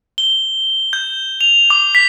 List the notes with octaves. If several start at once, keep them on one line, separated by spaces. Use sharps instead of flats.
G7
G6
F7
D6
B6